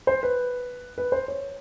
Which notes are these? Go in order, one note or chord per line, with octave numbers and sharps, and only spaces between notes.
C5
B4
B4
C5
C#5